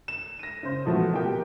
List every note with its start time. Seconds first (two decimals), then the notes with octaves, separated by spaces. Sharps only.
0.08 E7
0.39 A#6 D#7
0.63 C#3 C5
0.85 B2 E3 F3 A3 B3
1.13 A#3 G4 A#4 G5